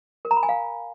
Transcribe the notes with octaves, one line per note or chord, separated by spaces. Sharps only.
A#4
A#5
B5
G#5
F5